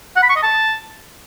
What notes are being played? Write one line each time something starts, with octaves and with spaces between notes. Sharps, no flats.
F#5
B5
C#6
D#5
A5